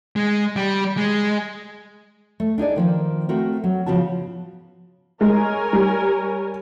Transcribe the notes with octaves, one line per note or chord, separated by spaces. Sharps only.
G#3
G3
G#3
A3
D4 D#4 G#4 D5
D#3 F3 A#3
A3 C4 F#4 A#4
F#3
G#2 C#3 F3 B3 F#4 A5
G#3 A#4 C#5 G#5
G3